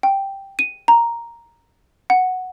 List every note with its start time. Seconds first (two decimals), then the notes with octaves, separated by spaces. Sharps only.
0.03 G5
0.59 D#7
0.88 A#5
2.10 F#5